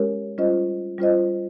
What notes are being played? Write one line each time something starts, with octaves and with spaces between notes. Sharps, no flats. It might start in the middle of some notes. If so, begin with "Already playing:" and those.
Already playing: G#3 C#4 G4 A#4 C#5
G3 C#4 F4 C5 D#5
G3 C#4 F4 C5 D#5